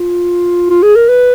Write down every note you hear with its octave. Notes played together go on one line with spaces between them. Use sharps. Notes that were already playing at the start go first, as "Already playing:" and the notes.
Already playing: F4
F4
G#4
A#4
B4